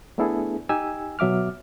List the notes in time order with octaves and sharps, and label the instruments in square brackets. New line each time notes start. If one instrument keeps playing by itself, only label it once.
[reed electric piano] A3 B3 D4 E4 G#4 A4
D#4 G4 G#5 E6
B2 F#3 E5 D6 F6